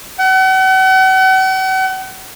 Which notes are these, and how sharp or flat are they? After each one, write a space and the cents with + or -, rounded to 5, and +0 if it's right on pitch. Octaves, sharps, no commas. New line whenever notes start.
F#5 +40